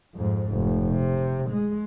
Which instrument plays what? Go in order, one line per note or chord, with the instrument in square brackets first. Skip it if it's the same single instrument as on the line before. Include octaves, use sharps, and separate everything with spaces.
[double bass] F2 G#2
F1
C3
G#3